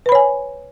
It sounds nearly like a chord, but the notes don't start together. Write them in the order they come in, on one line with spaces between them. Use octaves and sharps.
B4 B5 C#5 G#5